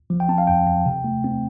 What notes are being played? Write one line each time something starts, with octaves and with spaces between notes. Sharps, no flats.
F3
G5
C4 A5
F5
F2 G5
F2 G5
C3
A3
C4